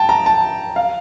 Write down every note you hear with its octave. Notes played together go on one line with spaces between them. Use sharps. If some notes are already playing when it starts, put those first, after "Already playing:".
Already playing: G5 A5
A#5
A5
F5